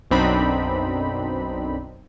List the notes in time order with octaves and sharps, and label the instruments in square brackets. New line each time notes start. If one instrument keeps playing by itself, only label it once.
[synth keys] B1 F#2 C4 D4 D#4 B5